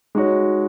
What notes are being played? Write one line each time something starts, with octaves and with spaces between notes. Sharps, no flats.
G#3 D#4 F#4 C#5